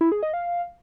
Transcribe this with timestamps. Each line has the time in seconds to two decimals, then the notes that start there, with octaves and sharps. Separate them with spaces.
0.01 E4
0.12 G#4
0.23 D#5
0.34 F5